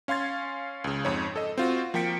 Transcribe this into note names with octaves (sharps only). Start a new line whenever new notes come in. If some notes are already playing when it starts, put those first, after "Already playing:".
C#4 F5 C6 G#6 A6
C#2 C#3
F2 G#2 C#5
A4 D#5
C4 F4 F#4
F3 A#3 G5 B6 C#7 D7